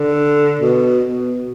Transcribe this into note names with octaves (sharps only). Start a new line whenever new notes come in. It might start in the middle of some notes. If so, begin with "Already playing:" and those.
Already playing: D3
B2
B2